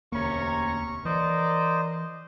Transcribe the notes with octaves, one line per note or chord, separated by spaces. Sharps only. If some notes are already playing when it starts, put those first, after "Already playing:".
E1 D2 C3 A#3 C#4 A#5 C#6
E3 A#4 C5 D5 D#5